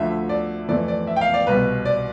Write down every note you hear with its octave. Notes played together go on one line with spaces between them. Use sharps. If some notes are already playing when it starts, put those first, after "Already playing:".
Already playing: D2 D3 F3 A3 E5
D5
F2 E3 A3 D5
D5
E5
G5
F5
D5
C2 B2 G3 B4
D5